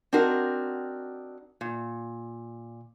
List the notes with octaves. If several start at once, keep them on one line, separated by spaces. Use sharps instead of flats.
C4 D4 D#4 F#4 A#4
A#2